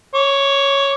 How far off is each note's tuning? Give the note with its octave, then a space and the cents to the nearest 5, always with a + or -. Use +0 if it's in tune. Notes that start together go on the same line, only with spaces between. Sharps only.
C#5 +0 D6 -35